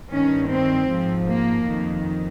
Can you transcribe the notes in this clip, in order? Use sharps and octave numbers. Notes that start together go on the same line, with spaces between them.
G2 D#3 C#4
C4
G#2 F3
A#3
F2 D#3